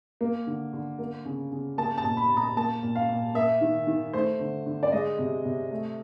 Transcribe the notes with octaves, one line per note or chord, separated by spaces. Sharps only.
A#3
D3
D3
A#3
C#3
C#3
A#3 A5
A5
A#2
B5
A#2
A#5
A#3 A5
A#2
F5
A#2
A#3 E5
D#3
D#3
A3 C5
D3
D3
D5
G#3 D#5
C3
C3
A3